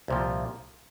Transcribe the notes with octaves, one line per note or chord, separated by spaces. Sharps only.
C2 A#2 F3